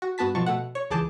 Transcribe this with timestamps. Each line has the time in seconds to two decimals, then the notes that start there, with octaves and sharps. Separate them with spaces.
0.02 F#4
0.18 G2 B3 F#4 A5 B6
0.35 B2 F3 A5 C#6
0.46 B2 A3 F#5
0.75 C#5
0.90 C#2 E3 G#4 A5 D6 G6